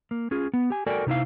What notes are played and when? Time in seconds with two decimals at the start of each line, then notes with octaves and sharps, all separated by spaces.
0.11 A#3
0.31 C#4 F4 G#4
0.54 B3
0.70 G4 G#5
0.86 F#4 A4 A#4 D5 G5 G#5
1.07 C3 D#4 E4 F5